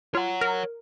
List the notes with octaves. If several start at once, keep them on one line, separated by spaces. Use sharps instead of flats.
F4 C#5 F#5
A#4